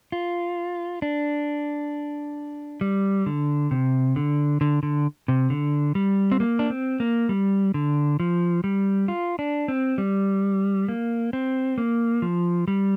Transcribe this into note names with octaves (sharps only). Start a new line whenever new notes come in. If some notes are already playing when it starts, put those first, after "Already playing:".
F4
D4
G3
D3
C3
D3
D3
D3
C3
D3
G3
C4
A#3
D4
C4
A#3
G3
D3
F3
G3
F4
D4
C4
G3
A#3
C4
A#3
F3
G3